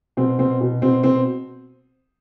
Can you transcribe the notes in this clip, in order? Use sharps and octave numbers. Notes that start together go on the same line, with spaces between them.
B2 C4
B2 C4
B2
B2 C4
B2 C4